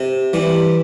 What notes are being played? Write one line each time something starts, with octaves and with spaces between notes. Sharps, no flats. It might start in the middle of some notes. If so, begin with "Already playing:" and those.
Already playing: C3
E3 G3